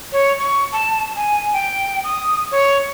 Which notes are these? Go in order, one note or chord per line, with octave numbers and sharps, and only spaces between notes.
C#5
C#6
A5
G#5
G5
D#6
C#5